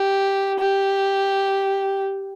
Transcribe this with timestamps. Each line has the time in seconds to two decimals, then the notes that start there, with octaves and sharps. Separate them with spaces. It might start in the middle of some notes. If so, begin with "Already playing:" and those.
Already playing: G4
0.59 G4